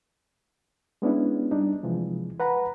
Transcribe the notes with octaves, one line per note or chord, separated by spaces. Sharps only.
G#3 B3 C#4 D4 E4
G3 D4 D#4
C3 E3 F3 G#3
B4 F#5 A#5 B5